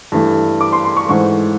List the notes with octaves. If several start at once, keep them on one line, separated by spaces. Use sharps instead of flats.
G2 E3 A3
D6
C6
C6
C#6
G#2 E3 A3 C#6